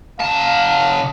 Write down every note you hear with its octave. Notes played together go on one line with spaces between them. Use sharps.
C#3 F5 A5